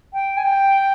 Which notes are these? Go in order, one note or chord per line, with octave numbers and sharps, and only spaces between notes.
G5
G#5
G5